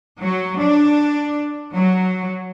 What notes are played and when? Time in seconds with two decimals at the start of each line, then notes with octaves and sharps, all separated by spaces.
0.22 F#3
0.62 D4
1.76 F#3